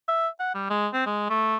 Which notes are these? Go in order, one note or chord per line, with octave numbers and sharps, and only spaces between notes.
E5
F#5
G3
G#3
C4
G#3
A3